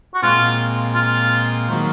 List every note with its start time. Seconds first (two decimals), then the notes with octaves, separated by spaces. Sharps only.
0.14 F#4
0.22 A#2 G#3 C4 F4
0.95 F4
1.69 D#3 F#3 A#3 F4